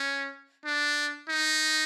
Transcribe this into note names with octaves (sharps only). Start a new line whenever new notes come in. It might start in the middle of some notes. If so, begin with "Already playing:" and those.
Already playing: C#4
D4
D#4